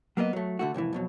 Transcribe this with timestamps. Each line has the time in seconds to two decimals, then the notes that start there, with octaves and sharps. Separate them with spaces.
0.17 F#3 A#3 B3 D#5
0.33 F#3 A3
0.59 D3 A3 F#4
0.74 C2 F2 A2 E3
0.93 F2 B2 F#3